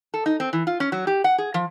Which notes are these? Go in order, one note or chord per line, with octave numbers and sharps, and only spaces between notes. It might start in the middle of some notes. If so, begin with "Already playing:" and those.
A4
D#4
C4
E3
F4
C#4
F#3
G4
F#5
G#4
F3